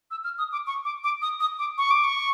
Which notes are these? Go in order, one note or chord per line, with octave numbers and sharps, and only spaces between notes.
E6
F6
D#6
D6
C#6
D6
D6
D#6
D#6
D6
C#6
D6
C#6